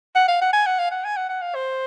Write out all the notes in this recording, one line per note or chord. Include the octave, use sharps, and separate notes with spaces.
F#5
F5
F#5
G#5
F#5
F5
F#5
G#5
F#5
F#5
F5
C5